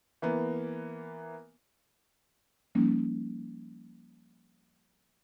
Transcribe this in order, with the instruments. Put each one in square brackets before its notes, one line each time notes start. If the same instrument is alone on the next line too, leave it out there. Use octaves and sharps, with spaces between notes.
[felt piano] E3 A#3 B3
[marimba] F3 G3 A#3 C#4 D#4